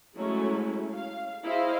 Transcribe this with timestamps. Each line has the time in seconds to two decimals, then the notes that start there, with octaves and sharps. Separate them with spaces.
0.16 F#3 G#3 A3 C#4 E4
0.94 F5
1.44 E4 G#4 C5 D#5 F5